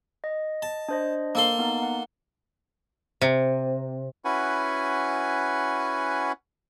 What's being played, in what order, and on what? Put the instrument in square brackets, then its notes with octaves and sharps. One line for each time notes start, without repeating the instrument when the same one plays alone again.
[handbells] D#5
[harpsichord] A5
[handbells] D4 C5 D#5
[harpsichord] A#3 A4 C6
[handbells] B3 D#4
F#5
[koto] C3
[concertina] C#4 E4 F#4 B4 F#5 G#5